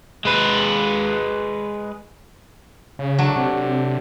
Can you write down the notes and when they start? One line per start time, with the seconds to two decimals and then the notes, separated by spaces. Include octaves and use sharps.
0.25 G#3 B4
2.99 C#3
3.19 F#3 A3 D4
3.36 C3